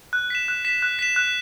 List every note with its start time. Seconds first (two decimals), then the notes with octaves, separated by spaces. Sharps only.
0.13 F#6
0.30 B6 E7
0.48 F#6
0.65 B6 E7
0.82 F#6
0.99 B6 E7
1.16 F#6